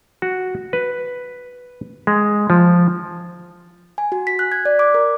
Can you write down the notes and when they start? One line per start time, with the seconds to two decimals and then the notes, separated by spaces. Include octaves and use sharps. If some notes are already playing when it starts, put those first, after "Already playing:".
0.22 F#4
0.73 B4
2.07 G#3
2.50 F3
3.98 G#5
4.12 F#4
4.27 B6
4.39 F#6
4.52 G#6
4.65 D5
4.79 D6
4.94 A#4